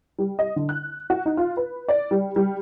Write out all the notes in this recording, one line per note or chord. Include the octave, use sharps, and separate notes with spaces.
G3
D#5
D3
F#6
F#4
D#4
F4
B4
D5
G3
G3